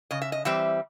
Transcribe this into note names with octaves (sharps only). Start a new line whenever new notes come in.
C#3 D#5
E5
D#5
E3 G3 C4 E5